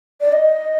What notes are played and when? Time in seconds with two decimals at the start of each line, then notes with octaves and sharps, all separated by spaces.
0.21 D5
0.32 D#5